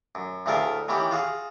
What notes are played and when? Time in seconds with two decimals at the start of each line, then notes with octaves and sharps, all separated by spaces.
0.15 F#2
0.46 D2 A2 A3 F4 G#4 A#4
0.88 D#3 E3 B3 C#4 G4
1.11 F4 F#4 G#4